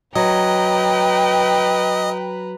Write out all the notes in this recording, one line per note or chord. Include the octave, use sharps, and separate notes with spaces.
F#3 B4 D#5 G5 A#5